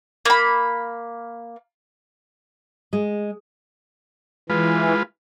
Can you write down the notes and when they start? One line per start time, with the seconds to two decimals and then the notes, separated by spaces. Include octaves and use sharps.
0.25 A#3 B5
2.93 G#3
4.50 E3 G#3 F4 B4